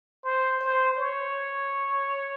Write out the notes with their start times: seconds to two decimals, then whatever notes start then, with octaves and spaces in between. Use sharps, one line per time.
0.24 C5
0.61 C5
0.97 C#5